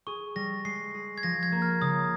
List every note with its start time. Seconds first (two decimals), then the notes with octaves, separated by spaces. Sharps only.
0.07 G#4 C#6
0.36 G3 A#6
0.64 G#3 C7
0.94 G#4
1.18 G#6
1.23 F3 A#6
1.43 G#6
1.52 A#3
1.62 F6
1.81 C#3 D#6